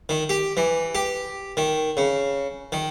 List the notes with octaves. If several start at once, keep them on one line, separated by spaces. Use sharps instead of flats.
D#3
G4
E3
G4
D#3
C#3
D#3